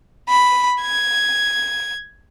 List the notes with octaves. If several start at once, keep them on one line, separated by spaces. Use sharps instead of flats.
B5
G#6